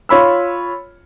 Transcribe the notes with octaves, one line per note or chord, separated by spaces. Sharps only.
F4 C#5 B5 E6